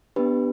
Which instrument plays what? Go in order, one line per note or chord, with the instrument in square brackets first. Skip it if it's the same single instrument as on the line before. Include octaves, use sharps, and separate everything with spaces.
[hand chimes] B3 D4 G4 B4